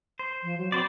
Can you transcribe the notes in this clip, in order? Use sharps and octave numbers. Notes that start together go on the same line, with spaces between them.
C5
F3
F#3
B3 C4 C5 D5